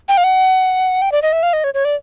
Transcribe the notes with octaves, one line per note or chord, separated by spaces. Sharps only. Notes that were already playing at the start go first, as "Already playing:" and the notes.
G5
F5
F#5
G5
D5
D#5
E5
F5
D#5
C#5
C#5
D5